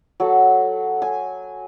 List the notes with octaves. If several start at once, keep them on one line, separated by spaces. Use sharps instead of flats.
F#3 A4
G#5